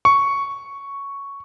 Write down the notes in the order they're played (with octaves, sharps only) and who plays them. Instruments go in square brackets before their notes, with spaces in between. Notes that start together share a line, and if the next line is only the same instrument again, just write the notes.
[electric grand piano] C#6